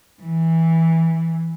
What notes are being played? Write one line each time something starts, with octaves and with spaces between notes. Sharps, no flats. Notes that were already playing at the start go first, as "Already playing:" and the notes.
E3